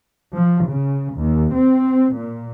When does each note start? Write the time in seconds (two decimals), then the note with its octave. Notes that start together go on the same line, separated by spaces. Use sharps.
0.37 F3
0.68 C#3
1.16 D#2
1.54 C4
2.15 A#2